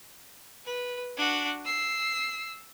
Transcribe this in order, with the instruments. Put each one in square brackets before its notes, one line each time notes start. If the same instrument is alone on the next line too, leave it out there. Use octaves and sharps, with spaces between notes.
[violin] B4
D4 F#4
E6 C7